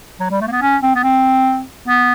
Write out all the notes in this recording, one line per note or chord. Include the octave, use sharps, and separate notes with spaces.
F#3
G3
A3
A#3
B3
C#4
C4
B3
C4
B3